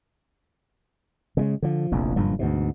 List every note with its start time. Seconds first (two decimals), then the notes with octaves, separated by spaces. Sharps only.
1.37 C#3 G3 G#3
1.62 D3 F3
1.92 F1 A#1 E2
2.16 F#1 G2 A#2 F3
2.39 D2 G#2 B2